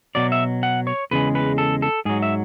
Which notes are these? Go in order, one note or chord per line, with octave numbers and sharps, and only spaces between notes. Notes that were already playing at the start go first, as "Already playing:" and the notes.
B2 F#3 D5
E5
F#5
C#5
E2 C#3 G#3 B4
B4
A4
A4
G#2 F#3 G#4
E5